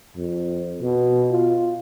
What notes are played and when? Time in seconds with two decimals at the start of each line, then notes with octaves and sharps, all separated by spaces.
0.17 F2
0.82 B2
1.32 F4